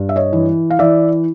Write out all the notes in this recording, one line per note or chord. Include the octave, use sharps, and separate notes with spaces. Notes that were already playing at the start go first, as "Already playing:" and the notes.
Already playing: G2
E5
C#5 D#5
E3
F5
E3 D5 E5